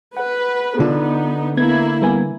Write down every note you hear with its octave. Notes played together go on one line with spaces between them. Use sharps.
B4 F#5
D3 B3 D#4 F4
A#3 B3 E4 G#6
G3 B3 G#5